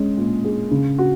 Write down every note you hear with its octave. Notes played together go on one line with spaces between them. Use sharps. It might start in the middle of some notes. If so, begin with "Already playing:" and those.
Already playing: G#3 C#4
A#2
G#4
C#3
F#4